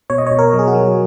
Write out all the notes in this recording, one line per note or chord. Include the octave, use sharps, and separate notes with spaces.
B2 C#5
D#5
C#5
B2
A#4
F#3
G#4
F#4
F#3